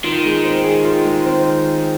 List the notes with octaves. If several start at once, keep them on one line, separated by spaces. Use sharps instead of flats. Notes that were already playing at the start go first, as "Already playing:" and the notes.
D#3 F4
G#3
C4
G#4
F4
G#3
C4